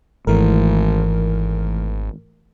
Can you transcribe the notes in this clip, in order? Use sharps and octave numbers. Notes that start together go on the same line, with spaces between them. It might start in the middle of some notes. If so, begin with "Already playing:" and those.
G#1 E3 A3 A#4